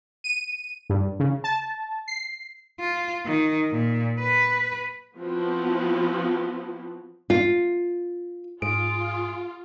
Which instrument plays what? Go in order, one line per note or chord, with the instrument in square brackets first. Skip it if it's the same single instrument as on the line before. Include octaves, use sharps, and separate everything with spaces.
[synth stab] D#7
G2
C#3
A5
C7
[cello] F4
D#3
A#2
B4
[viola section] F3 B3 C4 E4 F#4
[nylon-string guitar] F4
[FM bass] G#2 [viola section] F4 [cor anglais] G#4 [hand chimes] D7